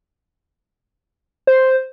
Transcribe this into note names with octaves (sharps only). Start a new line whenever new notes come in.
C5